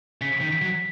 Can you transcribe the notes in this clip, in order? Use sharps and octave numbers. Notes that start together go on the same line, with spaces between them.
C#3 B6
D#3
B6
F#3